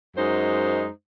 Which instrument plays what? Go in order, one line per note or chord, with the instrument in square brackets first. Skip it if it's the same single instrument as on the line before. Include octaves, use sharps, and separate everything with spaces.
[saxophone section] F#2 G#3 D#4 C5